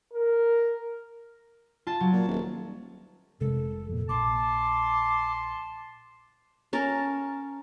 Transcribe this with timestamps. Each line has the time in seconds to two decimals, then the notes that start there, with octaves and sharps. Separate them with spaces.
0.13 A#4
1.87 F4 A5
2.00 F#3
2.13 A#2
2.28 D#1
3.40 F1 C3 G#3 A4
3.88 F2 A#2
4.09 A#1 A5 C6 D6
6.73 C#4 A#4 A5